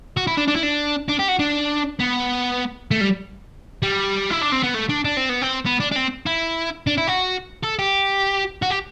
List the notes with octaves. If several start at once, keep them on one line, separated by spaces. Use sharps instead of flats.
F#4
E4
D4
D4
E4
D4
D4
G4
F#4
D4
B3
A3
G3
G3
E4
D4
C4
B3
A3
D4
D4
C4
B3
C4
B3
D4
D4
C4
E4
D4
E4
F#4
A4
G4
F#4
G4